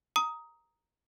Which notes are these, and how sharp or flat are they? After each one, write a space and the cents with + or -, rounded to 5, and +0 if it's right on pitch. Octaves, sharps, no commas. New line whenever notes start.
A#5 +0 D#6 +15